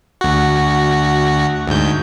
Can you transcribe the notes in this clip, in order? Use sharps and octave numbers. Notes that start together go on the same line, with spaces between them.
D2 F#4
D2 G#2 G6